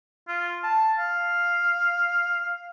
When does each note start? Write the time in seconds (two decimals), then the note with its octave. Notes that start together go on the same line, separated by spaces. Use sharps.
0.28 F4
0.63 A5
0.99 F5